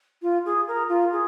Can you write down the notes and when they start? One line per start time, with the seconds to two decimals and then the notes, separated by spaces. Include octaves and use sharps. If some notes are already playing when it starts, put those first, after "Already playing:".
0.23 F4
0.45 G#4
0.68 A#4
0.89 F4
1.12 G#4